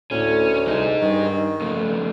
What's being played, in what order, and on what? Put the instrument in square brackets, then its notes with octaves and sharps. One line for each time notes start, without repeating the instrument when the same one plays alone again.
[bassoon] D2 [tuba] A2 [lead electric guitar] C#4
[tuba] C2 [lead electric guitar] D#4 G#4
[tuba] G2 [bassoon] D#3
[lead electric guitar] F2 C#3 [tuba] A3